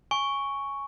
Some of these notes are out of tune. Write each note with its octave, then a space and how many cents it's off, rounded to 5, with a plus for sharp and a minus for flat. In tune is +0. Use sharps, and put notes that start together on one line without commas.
G#5 +0 C#6 +0